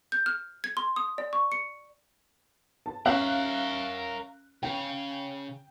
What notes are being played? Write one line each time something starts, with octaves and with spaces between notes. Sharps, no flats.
G6
F6
G#6
C6
D#6
D5
C#6
C#7
A5
C#4 A#4 E5 F5 F#6
C#3 G5